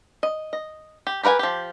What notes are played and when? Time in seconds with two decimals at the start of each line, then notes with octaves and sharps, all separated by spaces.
0.23 D#5
0.53 D#5
1.07 G4
1.23 G4 A#4 B4 F#5 G#5
1.39 F3 G4